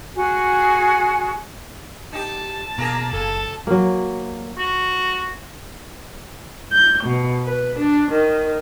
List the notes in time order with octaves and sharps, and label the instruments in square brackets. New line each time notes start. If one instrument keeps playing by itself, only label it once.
[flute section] F#4 G#4 G#5
[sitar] D#4 G4 [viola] A5
[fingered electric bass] B2 [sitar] A#3 G#4 [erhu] A#5
[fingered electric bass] F#1 [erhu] A4
[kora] F#3 A#3
[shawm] F#4
[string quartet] G6
B2
B4
D4
D#3